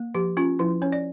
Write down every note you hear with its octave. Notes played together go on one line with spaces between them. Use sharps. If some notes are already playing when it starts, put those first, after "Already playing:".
Already playing: A#3
F3 G4
C#4 F4
F3 E4
C#4 C#5
D5